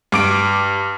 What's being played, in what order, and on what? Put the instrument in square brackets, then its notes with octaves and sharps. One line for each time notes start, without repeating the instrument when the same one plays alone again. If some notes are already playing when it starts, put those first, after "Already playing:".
[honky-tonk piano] G2 D6 D7